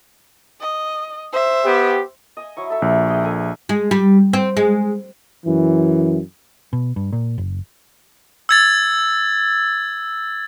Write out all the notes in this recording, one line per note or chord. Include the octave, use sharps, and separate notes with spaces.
D#5
C5 E5
B3 G4
D#5 G#5
F#3 E4 C#6
A4 E5
A#1
G#4 D#5 G5
A4 G#5
G#3
G3
C4
G#3
F#2 E3
B2
G2
A#2
F#1
E6 G#6 A6